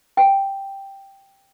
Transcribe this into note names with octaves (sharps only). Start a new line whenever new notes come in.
G5